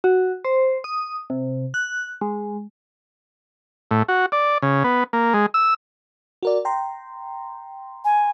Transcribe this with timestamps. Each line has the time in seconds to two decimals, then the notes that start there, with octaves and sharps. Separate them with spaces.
0.04 F#4
0.45 C5
0.84 D#6
1.30 C3
1.74 F#6
2.21 G#3
3.91 A2
4.08 F#4
4.32 D5
4.62 C#3
4.84 B3
5.13 A#3
5.34 G#3
5.54 E6
6.43 F#4 A#4 D5
6.65 G5 A#5 C6
8.05 G#5